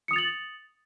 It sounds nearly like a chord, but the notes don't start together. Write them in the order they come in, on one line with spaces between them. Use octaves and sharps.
C#7 D#6 F7 A6 F#7